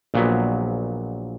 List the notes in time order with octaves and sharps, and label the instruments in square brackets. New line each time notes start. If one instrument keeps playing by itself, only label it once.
[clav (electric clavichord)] A#1 A#2 F#3 B3